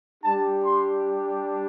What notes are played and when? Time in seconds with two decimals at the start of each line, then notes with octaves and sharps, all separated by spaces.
0.23 G3 D4 G4 A5
0.66 C6